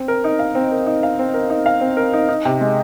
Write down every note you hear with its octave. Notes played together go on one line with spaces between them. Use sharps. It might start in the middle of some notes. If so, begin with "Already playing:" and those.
Already playing: C4
A#4
D#4
F5
C4
A#4
D#4
F5
C4
A#4
D#4
F5
C4
A#4
D#4
D#4
C3
G#3